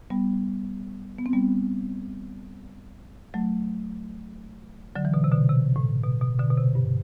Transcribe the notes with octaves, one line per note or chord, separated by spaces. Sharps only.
G3 B3
B3
C4
G3 B3
F#3 A3
D3 F#3
E3
B2 D3
C3
B2 D3
C3
A2
B2
B2
B2 D3
B2
C3
G2